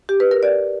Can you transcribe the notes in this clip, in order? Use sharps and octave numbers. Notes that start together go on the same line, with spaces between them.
G4
B4
A#4
D5